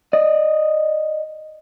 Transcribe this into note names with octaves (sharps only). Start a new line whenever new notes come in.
D5 D#5